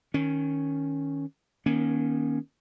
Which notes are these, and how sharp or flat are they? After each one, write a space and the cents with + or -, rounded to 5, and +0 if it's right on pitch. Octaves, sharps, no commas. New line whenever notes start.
D#3 +0 C#4 +0
D#3 +0 A#3 +35 C#4 +0